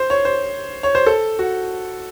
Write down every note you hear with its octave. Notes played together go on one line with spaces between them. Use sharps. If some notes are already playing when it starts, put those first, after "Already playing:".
Already playing: C5
C#5
C5
C#5
C5
A4
F#4